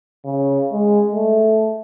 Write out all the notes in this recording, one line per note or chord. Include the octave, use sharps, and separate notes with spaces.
C#3
G#3
A3